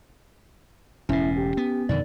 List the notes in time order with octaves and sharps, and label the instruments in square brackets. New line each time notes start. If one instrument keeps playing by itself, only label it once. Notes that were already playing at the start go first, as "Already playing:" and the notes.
[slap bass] E1 A2 [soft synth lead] C#4 [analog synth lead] E4
[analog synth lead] G4
[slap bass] B3
[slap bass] F2 B2 D3 [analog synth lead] D#3 [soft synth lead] D5